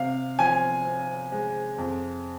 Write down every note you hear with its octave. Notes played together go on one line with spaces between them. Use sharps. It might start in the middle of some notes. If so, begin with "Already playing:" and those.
Already playing: C3 F5
F3 G#5
C4
G#3
F2